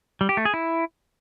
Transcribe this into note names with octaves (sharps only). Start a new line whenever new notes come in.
G3
G4
A3
G#4
E4